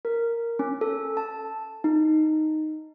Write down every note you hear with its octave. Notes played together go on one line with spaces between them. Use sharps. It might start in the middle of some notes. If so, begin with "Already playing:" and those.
A#4
C#4
A4
A5
D#4